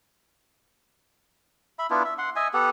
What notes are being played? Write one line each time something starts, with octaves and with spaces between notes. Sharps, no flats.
E5 B5
B3 D4 E4 F4
E5
F#5 C6
D#5 E5 G#5
B3 G4 A4 F#5